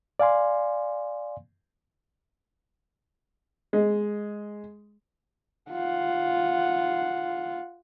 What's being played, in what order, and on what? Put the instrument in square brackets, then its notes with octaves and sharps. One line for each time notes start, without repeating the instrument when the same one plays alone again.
[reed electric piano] D5 F5 G#5 C6
[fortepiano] G#3
[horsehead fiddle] F4 F#5